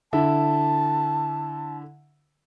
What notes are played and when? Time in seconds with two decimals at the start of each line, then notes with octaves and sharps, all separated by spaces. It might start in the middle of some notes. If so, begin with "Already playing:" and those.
0.13 D3 E4 E5 A5